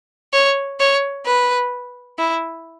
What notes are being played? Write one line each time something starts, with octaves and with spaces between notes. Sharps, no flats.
C#5
C#5
B4
E4